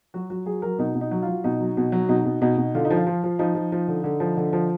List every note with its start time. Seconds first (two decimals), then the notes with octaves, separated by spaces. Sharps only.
0.14 F#3 F#4
0.30 F#3 F#4
0.46 F#3 G#4
0.62 F#3 A#4
0.79 B2 D#4
0.95 B2
1.01 D#4
1.11 F#3
1.22 F4
1.28 F#3
1.44 B2 D#4
1.60 F#3
1.77 B2
1.92 F#3
2.09 B2 D#4
2.25 B2
2.42 B2 D#4
2.58 B2
2.75 D3 F4
2.85 D#4
2.90 F3
2.97 F4
3.07 F3
3.24 F3
3.39 F3 D#4
3.55 F3
3.72 F3
3.88 D3
4.04 D3
4.20 F3
4.37 D3
4.53 F3